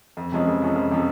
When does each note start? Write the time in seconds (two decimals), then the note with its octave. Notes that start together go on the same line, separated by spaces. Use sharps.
0.17 F2
0.32 C3 F3 G#3 C#4
0.47 F2
0.62 C3 F3 G#3 C#4
0.76 F2
0.91 C3 F3 G#3 C#4